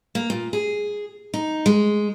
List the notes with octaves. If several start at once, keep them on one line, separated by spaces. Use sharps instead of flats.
A#3
A#2
G#4
D#4
G#3